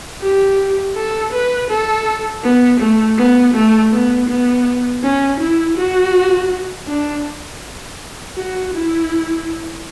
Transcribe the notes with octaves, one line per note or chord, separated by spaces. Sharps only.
G4
A4
B4
A4
B3
A3
B3
A3
B3
B3
C#4
E4
F#4
D4
F#4
E4